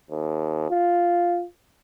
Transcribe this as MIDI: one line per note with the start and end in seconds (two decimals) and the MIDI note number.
0.10 0.66 39
0.70 1.45 65